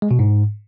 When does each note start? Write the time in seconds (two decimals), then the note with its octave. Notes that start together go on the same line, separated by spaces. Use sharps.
0.02 G#3
0.11 B2
0.19 G#2